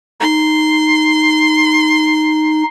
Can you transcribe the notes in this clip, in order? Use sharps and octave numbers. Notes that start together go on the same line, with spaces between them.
D#4 C6